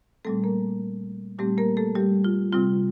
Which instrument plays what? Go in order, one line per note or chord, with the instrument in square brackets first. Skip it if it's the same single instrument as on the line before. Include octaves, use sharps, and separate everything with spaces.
[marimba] A#2 G3 A3 C4 A4
A#3 A#4
A#2 G3 A3 C4 G4
A#3 A#4
A3 A4
G3 G4
F4
C3 G3 C4 F4